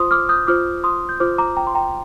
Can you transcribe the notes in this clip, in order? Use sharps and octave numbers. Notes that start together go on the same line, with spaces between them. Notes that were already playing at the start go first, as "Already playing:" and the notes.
Already playing: F4 C5 C6 D#6
D6 F6
D#6 G6
F4 C5 D6 F6
C6 D#6
G6
F4 C5 D6 F6
A#5 D6
G5 A#5
C6
G5 A#5